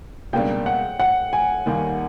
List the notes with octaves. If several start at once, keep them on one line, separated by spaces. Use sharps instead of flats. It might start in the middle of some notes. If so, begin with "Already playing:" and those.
C#2 B2 G3 A#3 D4 G5
F#5
F#5
G#5
D#2 D#3 G3 A#3 D#4